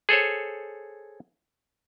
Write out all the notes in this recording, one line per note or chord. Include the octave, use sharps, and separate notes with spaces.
G#4 A4 C5 C#5